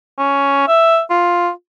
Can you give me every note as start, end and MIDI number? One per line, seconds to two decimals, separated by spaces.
0.18 0.66 61
0.68 1.00 76
1.10 1.50 65